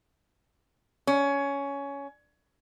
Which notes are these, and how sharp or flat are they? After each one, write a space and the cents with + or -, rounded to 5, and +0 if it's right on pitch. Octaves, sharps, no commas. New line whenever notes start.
C#4 +15